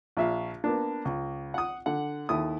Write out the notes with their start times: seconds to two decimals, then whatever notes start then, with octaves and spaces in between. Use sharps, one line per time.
0.17 A#1 E5 F5
0.64 A#3 B3 D4
1.05 C#2
1.54 F#5 D#6
1.86 D3 F#5
2.29 D#2 E4 A4 D#6